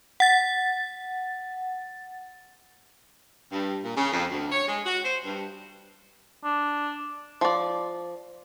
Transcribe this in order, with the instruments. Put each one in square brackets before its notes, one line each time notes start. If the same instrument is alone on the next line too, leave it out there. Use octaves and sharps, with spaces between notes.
[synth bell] F#5 A6
[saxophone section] G2
A#2
C#3
F2
D2
C#5
G#3
F#4
C5
G2
[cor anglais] D4
[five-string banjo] F3 D5